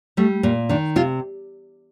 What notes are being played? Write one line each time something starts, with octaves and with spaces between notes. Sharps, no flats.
G3 A3
A#2 A#3
D#3 D4
C3 F4